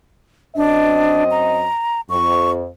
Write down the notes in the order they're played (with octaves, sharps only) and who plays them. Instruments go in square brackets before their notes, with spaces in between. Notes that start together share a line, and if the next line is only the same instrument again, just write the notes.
[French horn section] F#2 C4 D#5 [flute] D4
[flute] A#5
[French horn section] F2 [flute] C#6